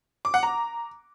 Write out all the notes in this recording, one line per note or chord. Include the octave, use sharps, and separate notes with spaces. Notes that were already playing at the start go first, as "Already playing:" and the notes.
D6
F#5
A#5